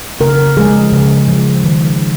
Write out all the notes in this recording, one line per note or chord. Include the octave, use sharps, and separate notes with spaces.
C#3 A#4
F3 G#3 G#4
C#3
F3 G#3
D#3